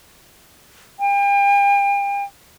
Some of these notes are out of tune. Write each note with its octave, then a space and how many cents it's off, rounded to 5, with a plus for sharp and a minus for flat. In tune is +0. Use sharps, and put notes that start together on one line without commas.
G5 +40